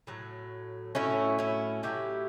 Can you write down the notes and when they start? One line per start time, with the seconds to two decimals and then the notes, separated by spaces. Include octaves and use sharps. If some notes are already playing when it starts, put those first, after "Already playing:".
0.07 A2 F#3 A3
0.95 A2 F#3 A3 C#4 E4
1.39 C#4 E4
1.83 A2 F#3 A3 E4 G4